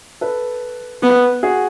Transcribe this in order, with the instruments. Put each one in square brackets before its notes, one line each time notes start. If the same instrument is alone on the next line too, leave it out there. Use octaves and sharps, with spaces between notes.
[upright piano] A4 B4
[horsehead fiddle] B3
[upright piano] F#4 G#4